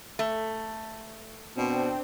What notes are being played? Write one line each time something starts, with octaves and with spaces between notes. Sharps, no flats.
A3
B2 C4 D4